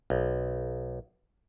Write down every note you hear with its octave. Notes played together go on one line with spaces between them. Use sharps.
B1